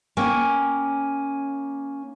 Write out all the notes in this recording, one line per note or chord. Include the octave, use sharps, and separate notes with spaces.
A#3 C#4 G5 G#5